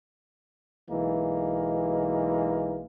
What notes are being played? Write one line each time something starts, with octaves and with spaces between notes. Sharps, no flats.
B1 E3 G#3 A#3